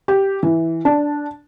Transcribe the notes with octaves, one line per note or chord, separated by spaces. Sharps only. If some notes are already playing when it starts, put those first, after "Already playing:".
G4
E3
D4